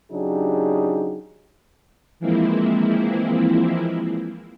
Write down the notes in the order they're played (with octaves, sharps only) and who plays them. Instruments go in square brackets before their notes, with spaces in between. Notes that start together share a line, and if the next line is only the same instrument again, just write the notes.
[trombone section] C#3 F#3 D4 D#4 G4 G#4
[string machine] E3 F3 G#3 A#3 C4 E4